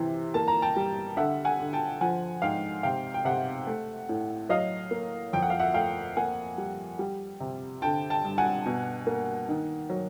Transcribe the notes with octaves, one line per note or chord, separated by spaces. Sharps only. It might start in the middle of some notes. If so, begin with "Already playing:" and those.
Already playing: C3 E3
A#3 A5
A#5
G5 A5
G3
D3 E5 F#5
F#5 G#5
D3
G5 A5
F3 F#5 G#5
G#2 F5 G5
C3 F5 G5
G5
C3 E5 F#5
A3
A2
F#3 D#5 F5
A#3
F2 G5
F#5
F5
E5 F#5
A3 F5 G5
A#3 F#5 G#5
G3
G3
C3
D3 G5 A5
G5 A5
G2
F#5 G#5
B2
A#3
D#3
F#3